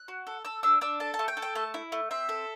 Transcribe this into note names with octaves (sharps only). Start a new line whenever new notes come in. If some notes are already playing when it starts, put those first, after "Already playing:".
Already playing: F#6
F#4
A4
A4 E6
D4 E6
D4 E6
A4 A5
A5
A3
G5
A4
G5
A3 A5
E4
A3
C4 E5
A4